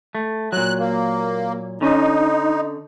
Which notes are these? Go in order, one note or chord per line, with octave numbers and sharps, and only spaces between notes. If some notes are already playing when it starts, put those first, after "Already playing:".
A3
A#2 F#3 F#6
A#3
D3 C#4 D#4 D#5